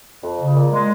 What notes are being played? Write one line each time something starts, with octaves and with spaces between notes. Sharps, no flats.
F2
C#3
A#2
G#3